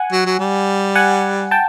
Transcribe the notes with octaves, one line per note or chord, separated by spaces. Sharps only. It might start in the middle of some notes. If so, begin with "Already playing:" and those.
Already playing: F#5 G#5
F#3
F#3
G3
F#5 G#5
G5 A5